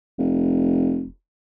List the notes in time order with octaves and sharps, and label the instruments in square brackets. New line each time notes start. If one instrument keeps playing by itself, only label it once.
[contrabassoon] F1